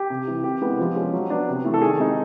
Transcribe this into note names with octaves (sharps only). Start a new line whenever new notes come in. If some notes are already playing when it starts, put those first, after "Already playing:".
Already playing: G4
C3
E3 G3
C3 G4
E3 G#3 B3
F3
G#3 C#4
F#3
B3 D4
C3
E3 A3
A4
D#3 G#4
G#3 C4 D#4